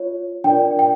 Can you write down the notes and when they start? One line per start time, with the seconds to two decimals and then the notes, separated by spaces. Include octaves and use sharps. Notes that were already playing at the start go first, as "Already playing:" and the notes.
Already playing: F4 C#5
0.44 D4 F4 A#4 D5 G5
0.79 G5